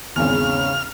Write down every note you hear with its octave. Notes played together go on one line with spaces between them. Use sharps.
G#1 E2 C#3 F6